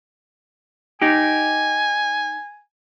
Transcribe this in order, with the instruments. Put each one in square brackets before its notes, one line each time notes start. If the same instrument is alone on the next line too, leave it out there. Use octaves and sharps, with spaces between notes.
[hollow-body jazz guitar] D#4 G4 [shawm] G#5